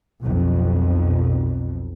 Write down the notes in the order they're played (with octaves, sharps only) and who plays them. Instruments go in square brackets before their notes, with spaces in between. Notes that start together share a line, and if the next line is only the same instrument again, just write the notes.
[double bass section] B1 F2